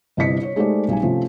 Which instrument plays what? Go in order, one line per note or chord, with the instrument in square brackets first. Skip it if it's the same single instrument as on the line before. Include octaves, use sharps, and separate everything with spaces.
[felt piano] G1 C3 E4 D#5 B6 C#7
C#5
G#3 A3 D#4 G4 C5 D5
B1 G3 D#4 G#5
C3 F3 A3 C4 C#4